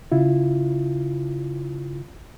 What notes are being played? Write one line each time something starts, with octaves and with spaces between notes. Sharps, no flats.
C#3 E4 F4